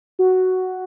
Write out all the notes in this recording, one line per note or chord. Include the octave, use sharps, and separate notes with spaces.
F#4